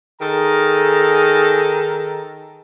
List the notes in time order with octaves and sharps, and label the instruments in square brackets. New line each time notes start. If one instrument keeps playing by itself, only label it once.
[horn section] D#3 G#4 A4 A#5